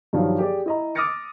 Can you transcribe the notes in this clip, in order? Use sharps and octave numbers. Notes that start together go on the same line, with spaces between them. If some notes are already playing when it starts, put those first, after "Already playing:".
G2 D#3 F3 F#3
G4 G#4 D5
E4 D#5 A#5
D6 D#6 F6 A6 A#6 C#7